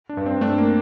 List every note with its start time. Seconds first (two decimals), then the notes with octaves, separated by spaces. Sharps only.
0.09 D4
0.17 G2
0.26 C4
0.41 A3 D4
0.58 A#3